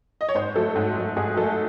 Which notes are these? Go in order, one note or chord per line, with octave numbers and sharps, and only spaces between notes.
D#5
C#5
G#2 C5
F#3 A3 A4
G#2
F#3 A3
G#2 G#4
F#3 A3 A4